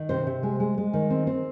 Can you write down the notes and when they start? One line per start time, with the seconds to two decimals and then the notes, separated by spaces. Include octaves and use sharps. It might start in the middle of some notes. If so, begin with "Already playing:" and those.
Already playing: D#3
0.09 C3 C5
0.27 C3
0.43 G#3
0.60 G#3
0.78 G#3
0.93 D#3
1.10 C4
1.27 C4